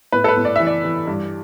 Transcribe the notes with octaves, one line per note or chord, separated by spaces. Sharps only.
A2 B4
A4
B4
A2
D5
E3 E5
D5
E3
G2